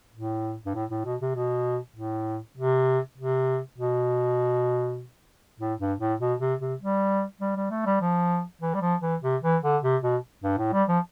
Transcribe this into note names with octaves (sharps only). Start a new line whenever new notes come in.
A2
G2
A2
A2
B2
C3
B2
A2
C3
C3
B2
A2
G2
A2
B2
C3
C3
G3
G3
G3
A3
G3
F3
E3
G3
F3
E3
C3
E3
D3
C3
B2
G2
A2
G3
F3